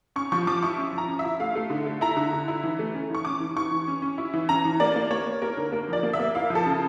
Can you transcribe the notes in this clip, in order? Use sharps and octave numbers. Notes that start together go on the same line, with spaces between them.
C#4 C#6
F3 C#6
F3 D6
E4 C#6
C#4
F3
A#5
C#4
E5
E4
A3 F5
A3
D3
A3
E4 A#5
D3
D3
E4
E3
A3
C#4
E3 C#6
C#4 D6
E3
E3 C#6
E3
C#4
C#4
E4
E3
C#4 A#5
E3
A#3 D5
A#3
A#3 C#5
A#3
A#3 A#4
D3
A#3 A#4
F3 D5
A#3
E5
A#3
E4 F5
F3
A4
C#3